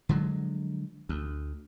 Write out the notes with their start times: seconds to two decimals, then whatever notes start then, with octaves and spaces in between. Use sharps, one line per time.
0.09 D3 F3 F#3 G#3
1.09 D2